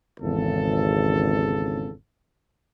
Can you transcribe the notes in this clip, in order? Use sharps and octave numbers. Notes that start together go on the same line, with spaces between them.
G#1 E2 C#3 A4